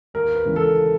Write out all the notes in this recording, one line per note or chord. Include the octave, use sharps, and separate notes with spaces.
D#2 A#4
B4
C#3 E3 G#3
A4